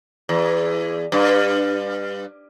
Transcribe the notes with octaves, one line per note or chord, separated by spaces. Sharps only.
E2
G2